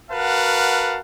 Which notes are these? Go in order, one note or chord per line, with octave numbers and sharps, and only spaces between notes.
F#4 A#4 B4 F5 F#5 A5